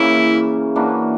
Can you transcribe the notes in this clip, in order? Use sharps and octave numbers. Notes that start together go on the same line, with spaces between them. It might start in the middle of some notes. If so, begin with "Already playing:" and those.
Already playing: C#3 E3 A#3 C#4 E4
E3 A#3 D4 F#4